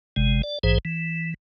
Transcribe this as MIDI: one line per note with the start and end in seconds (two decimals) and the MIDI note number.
0.16 0.42 31
0.16 0.42 48
0.16 0.42 56
0.43 0.59 74
0.63 0.78 34
0.63 0.78 44
0.63 0.78 52
0.63 0.78 68
0.63 0.78 72
0.85 1.34 52